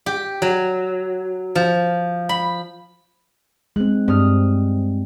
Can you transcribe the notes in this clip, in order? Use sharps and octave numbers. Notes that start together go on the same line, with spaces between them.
G4
F#3
F3
B5
G#3 C4 F#6
G2 C4 D#6 F6